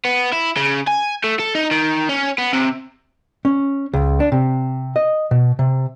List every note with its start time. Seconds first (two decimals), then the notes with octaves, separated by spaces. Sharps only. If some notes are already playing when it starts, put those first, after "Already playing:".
0.05 B3
0.33 E4
0.57 C#3
0.87 G#5
1.24 A3
1.39 A4
1.55 D#4
1.71 D#3
2.09 C#4
2.38 B3
2.53 C3
3.45 C#4
3.93 C#2
4.20 D4
4.32 C3
4.96 D#5
5.31 B2
5.59 C3